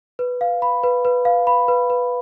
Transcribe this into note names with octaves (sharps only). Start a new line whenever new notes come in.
B4
F5
B5
B4
B4
F5
B5
B4
B4